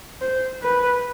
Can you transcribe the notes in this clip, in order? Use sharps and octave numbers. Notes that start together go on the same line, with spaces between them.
C5
B4